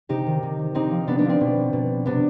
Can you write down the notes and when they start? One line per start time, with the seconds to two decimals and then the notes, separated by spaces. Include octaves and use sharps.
0.09 C3 D#4 G4
0.26 D#3
0.43 C3
0.59 D#3
0.75 C3 C4 D#4
0.91 F3
1.07 C3 B3 D4
1.18 B3 D4
1.25 F3 C4
1.40 B2
1.73 B2
2.06 C3 B3 D4